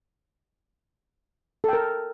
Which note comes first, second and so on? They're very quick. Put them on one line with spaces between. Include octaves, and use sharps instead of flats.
A4 G5 A#4